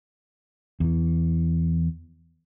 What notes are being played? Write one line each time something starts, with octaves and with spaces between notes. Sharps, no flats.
E2 E3